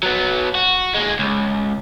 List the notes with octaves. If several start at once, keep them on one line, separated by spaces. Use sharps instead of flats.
F#3 B3
F#4
D#2 G#3
C#2